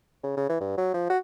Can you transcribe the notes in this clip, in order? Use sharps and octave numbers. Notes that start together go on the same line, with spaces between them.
C#3
C#3
E3
G2
F#3
F3
F#4